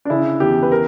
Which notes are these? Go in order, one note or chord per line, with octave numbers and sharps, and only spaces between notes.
D4
C#3 E4
E2 G4
B4
A#4